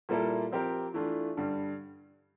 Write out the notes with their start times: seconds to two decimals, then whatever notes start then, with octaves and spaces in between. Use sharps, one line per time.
0.09 A#2 G3 A#3 E4 A4
0.52 F3 C4 G4 A#4
0.94 E3 A3 D4 F4
1.37 G2 D3 G3